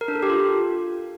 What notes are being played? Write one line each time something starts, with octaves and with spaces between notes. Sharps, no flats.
A#4
D4
A4
G4
F4